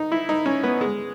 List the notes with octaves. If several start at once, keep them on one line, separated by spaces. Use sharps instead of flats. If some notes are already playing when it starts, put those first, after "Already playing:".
Already playing: D#4
E4
D#4
C#4
B3
G#3